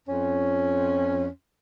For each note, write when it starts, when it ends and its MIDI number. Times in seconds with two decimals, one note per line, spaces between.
0.08 1.27 41
0.08 1.27 61